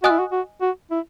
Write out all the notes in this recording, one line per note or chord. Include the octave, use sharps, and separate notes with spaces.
F#4 D#5 G#5 D#6 F#6
E4
F#4
F#4
F#4
E4